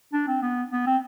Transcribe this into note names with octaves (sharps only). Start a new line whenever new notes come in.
D4
C4
B3
B3
C4